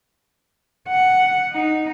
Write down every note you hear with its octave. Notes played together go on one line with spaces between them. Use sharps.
F#5
D#4